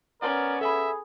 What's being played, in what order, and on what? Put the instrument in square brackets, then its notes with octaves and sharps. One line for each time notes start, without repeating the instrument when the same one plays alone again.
[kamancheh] B3 C#4 [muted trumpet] A#4 [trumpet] D5
[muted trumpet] G#4 [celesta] A4 B5 [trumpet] E5